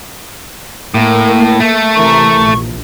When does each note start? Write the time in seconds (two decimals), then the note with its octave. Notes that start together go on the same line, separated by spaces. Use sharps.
0.94 A2 A#3
1.60 A3
1.95 C3 E3 A#4 C#6
2.38 A#1